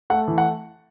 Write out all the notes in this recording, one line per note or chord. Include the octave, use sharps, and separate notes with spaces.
A3 F#5
E3
F#5